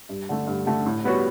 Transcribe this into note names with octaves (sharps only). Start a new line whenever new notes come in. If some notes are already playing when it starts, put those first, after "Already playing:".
G2
D3 A3
G2
D3 A3
A2
G3 B3 F#4 C#5